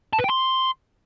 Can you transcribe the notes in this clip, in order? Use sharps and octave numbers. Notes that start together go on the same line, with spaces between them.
A5
B4
G5
C6